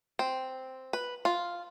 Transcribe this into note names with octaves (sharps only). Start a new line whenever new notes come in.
C4
B4
F4